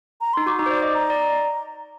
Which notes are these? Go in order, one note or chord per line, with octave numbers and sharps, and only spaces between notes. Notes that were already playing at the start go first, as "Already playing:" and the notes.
A#5
D#4 C6
F#4 D6
D#4
C5
D5
D#5
A#5
D5